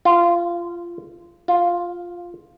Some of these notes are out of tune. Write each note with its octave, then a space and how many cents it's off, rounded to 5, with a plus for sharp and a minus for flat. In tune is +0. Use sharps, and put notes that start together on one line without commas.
F4 -20
F4 +0